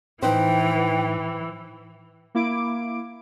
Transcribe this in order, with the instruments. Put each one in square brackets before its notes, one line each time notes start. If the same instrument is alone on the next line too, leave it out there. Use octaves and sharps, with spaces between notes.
[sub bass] A2 [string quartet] E3 [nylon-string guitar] D#4 B4 C5 [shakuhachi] G5
[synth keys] A#3 E4 D6 D7